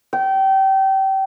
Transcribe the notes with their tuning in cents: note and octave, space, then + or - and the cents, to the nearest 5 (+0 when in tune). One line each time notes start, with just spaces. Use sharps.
G5 -25